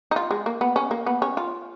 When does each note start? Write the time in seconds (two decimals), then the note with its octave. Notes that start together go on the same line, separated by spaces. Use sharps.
0.11 D#4
0.16 F4
0.31 G#3
0.46 A#3
0.61 B3
0.76 C#4
0.91 A#3
1.06 B3
1.22 C#4
1.37 F4